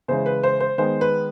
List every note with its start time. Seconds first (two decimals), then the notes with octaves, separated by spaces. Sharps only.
0.08 C#3 E3 G#3 C5
0.26 B4
0.43 C5
0.60 C5
0.78 D#3 G#3 B3 C5
1.01 B4